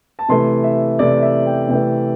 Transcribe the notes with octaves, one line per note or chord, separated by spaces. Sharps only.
A5
C3 E3 A3 C6
E5
C3 E3 A3 D5
E5
G5
C3 E3 A3 G5